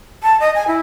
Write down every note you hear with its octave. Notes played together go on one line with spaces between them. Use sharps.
A5
D#5
G#5
E4